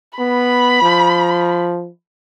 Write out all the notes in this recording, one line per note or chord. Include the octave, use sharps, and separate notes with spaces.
B3 B5
F3